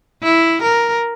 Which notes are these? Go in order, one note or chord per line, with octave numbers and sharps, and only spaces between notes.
E4
A#4